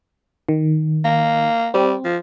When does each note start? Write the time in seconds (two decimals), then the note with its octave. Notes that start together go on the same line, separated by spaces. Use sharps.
0.49 D#3
1.05 A#3
1.74 G3 C4
2.04 F3